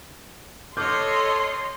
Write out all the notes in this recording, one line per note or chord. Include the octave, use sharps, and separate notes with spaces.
A4 C#5 D#5 C6 D6 F6 G6